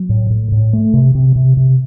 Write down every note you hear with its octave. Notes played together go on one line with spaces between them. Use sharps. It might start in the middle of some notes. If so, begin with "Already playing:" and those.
Already playing: F#3
A2
A2
A2
A3
C3
C3
C3
C3